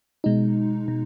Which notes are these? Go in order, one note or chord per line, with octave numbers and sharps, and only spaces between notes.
B2 G#3 D#4
B2